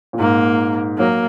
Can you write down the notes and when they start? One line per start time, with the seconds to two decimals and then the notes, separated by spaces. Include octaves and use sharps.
0.13 A#2
0.19 G#2 A#3
0.98 F#3 A#3